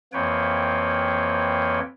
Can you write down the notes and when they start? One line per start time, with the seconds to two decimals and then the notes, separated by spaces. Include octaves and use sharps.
0.13 F2 E3 A#3 B4 C#5 G5